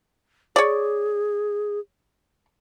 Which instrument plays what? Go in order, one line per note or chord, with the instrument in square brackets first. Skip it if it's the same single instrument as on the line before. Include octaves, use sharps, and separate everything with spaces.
[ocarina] G#4 [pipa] C#5 D5